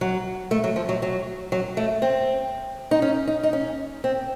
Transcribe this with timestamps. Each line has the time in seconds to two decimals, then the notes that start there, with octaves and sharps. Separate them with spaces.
0.01 F#3
0.51 A3
0.64 F#3
0.76 F3
0.89 F#3
1.02 F#3
1.52 F#3
1.77 A3
2.02 C4
2.91 D#4
3.02 C#4
3.27 D#4
3.43 D#4
3.53 C#4
4.04 C4